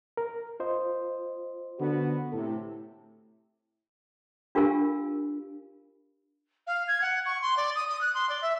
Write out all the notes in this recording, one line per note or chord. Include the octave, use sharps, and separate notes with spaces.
A#4
F4 C5 D#5
D3 B3 F#4
A2 C3 A4
D4 F4 G4 A#4 F5 G#5
F5
G#6
F#5
C#6
C6
D5
D#6
D#6
F#6
C6
D5
E5